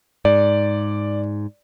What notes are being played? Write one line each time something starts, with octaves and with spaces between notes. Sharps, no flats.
G#2 D5